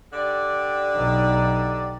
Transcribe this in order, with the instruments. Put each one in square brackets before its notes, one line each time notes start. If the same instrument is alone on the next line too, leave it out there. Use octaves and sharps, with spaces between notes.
[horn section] D3 G4 D5
[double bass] B1 D#4